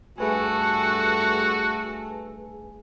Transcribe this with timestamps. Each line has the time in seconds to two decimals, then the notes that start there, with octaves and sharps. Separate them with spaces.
0.18 G2 A3 F#4 G#4 A4 B4 G#5